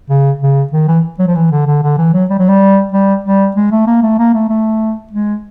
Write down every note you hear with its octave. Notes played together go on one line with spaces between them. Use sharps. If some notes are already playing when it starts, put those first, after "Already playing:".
C#3
C#3
D#3
E3
F#3
F3
E3
D3
D3
D3
E3
F#3
G3
F#3
G3
G3
G3
G#3
A3
A#3
A3
A#3
A3
A3
G#3